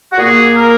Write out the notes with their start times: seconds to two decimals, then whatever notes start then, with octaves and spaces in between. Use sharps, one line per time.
0.13 F#4
0.17 A#2 A#3 G#4
0.56 A#4